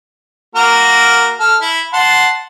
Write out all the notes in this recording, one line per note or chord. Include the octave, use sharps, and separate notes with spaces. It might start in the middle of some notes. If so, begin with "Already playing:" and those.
A#3 F#4 A#4
A4 F6
E4
F#5 A5 C6